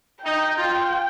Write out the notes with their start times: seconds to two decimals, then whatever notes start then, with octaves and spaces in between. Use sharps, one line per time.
0.25 D#4 G5
0.57 F4